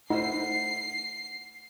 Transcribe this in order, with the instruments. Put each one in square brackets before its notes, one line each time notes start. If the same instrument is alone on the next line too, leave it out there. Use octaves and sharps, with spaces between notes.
[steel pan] A3 E4 C5 [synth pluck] D#4 [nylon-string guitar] F#5 [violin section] C7